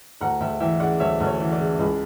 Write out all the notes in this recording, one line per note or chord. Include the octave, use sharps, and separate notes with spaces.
D2 F#5 A#5
D2 E5 G5
E3 E5 G5
C#3 D5 F#5
D2 C#5 E5
D2
C#5
E3
D5
C#3
C#2